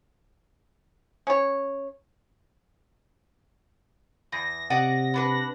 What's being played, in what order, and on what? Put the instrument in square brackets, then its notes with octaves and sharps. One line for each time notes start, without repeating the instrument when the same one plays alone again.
[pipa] C#4 C#5
[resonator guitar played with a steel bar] E2 [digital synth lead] A#6
[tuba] C3 [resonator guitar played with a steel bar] D5 D#5 F#5
[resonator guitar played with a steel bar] B3 D4 B4